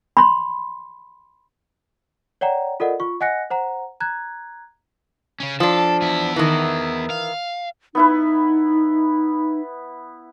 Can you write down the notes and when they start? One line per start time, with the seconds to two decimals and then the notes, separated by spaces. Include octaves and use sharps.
0.17 B5 C6
2.41 C#5 D5 F#5 G5 A#5
2.80 F4 A4 A#4 D5 D#5 F#5
3.00 F4 C#6
3.21 D#5 F#5 G#5 F#6 A#6 C#7
3.50 C5 F#5 A#5
4.00 A#5 F#6 G#6
5.40 C#3 C#4
5.60 F3 D4 A4
6.02 E2 E4
6.36 D#3 E3
7.10 F5
7.95 B3 D#4 E4 B4